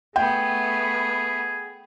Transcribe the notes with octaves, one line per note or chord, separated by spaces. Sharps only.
A3 B3 G#4 G5